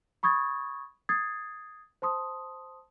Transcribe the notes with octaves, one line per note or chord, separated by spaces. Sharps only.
B5 C#6 D#6 G#6 A6
D#6 G#6 A6 C7
C5 A5 C6 D#6